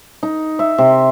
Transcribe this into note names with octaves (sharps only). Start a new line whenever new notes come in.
D#4
E5
C3